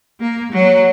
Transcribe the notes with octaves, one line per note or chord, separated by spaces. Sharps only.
A#3
F#3